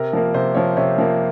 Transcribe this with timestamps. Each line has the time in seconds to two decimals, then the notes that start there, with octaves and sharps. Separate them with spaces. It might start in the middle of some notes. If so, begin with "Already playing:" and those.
Already playing: C3 A#4
0.13 F3 A#3
0.34 C3 C5
0.55 F3 A#3 C#5
0.77 C3 C#5
0.98 F3 A#3